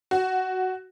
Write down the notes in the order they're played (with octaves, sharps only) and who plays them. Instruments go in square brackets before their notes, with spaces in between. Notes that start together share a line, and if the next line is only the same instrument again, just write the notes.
[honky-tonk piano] F#4